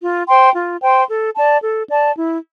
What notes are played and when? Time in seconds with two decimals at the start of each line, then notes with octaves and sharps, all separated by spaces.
0.01 F4
0.27 C5 G5 C6
0.55 F4
0.82 C5 G5 C6
1.08 A4
1.35 D5 A5
1.62 A4
1.89 D5 A5
2.16 E4